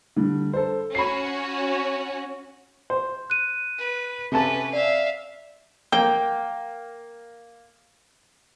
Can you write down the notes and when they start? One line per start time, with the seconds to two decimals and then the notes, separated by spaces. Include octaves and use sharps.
0.16 D3 G3
0.53 A4 C5
0.95 C#4 F#4 B5 C7
2.90 C5
3.30 F#6 D#7
3.78 B4
4.32 C3 C#4 A4 B4 A5
4.73 D5 E5 F5
5.92 A#3 G5